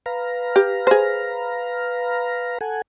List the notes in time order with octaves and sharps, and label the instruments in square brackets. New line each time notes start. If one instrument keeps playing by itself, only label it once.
[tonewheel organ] B4 F5 A#5
[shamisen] G4
G#4 C5
[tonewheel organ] A4 F#5 G#5